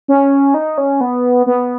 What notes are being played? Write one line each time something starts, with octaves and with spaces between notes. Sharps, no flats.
C#4
D#4
C#4
B3
B3